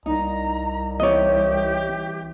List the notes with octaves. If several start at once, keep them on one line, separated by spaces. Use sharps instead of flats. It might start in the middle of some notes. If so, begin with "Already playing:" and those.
C2 D#4 A#5
E3 C4 E4 G4 C#5 D#5